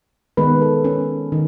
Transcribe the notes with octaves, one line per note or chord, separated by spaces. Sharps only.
D#3 G#3 B3 B4
A4
C#4
D#3